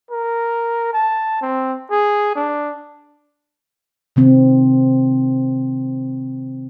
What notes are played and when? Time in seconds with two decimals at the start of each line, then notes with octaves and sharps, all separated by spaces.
0.11 A#4
0.93 A5
1.42 C4
1.91 G#4
2.36 D4
4.16 C3 D#3 C4